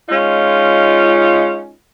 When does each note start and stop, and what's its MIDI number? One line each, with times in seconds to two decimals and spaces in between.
0.09 1.73 56
0.09 1.73 61
0.09 1.73 63
0.09 1.73 65